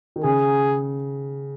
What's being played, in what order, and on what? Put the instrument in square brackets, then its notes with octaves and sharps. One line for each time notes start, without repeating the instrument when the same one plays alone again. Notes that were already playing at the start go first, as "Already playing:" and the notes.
[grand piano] D#3
[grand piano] C#3 [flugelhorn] G#4